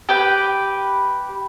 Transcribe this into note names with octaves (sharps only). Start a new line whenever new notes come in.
G4 B4 G5